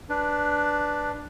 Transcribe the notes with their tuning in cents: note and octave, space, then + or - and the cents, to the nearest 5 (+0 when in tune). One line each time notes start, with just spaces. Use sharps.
D4 +0 B4 +0